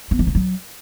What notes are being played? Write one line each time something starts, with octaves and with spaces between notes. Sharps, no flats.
B3
F3
C#3
F#3